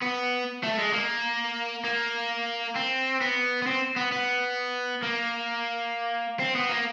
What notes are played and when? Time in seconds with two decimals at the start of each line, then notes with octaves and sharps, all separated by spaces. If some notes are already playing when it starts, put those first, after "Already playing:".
0.02 B3
0.63 A3
0.78 G#3
0.93 A#3
1.84 A#3
2.75 C4
3.21 B3
3.62 B3
3.67 C4
3.96 B3
4.12 B3
5.03 A#3
6.39 C4
6.55 B3
6.70 A#3